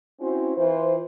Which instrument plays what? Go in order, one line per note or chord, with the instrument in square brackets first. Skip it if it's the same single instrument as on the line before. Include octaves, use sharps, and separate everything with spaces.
[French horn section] C4 C#4 E4 F#4 C5
E3 F4 C5